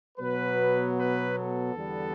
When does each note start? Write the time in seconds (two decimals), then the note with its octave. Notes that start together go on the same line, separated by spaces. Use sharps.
0.18 B2 F#3 B3 B4
0.97 B4
1.36 A4
1.75 E2 D3 G3 B3